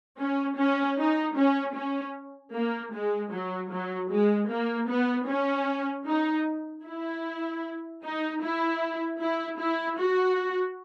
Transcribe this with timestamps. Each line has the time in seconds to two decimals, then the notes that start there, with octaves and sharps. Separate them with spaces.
0.19 C#4
0.58 C#4
0.98 D#4
1.37 C#4
1.75 C#4
2.54 A#3
2.94 G#3
3.33 F#3
3.72 F#3
4.11 G#3
4.50 A#3
4.89 B3
5.28 C#4
6.06 D#4
6.85 E4
8.04 D#4
8.42 E4
9.21 E4
9.59 E4
9.99 F#4